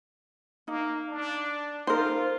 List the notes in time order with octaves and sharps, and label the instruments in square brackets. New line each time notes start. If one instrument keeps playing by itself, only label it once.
[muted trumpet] A#3 [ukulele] D#4
[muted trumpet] D4
[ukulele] D#4 A#4 [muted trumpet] F4 [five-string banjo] C5